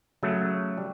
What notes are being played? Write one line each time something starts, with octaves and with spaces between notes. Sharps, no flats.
C#3 F#3 A3
G3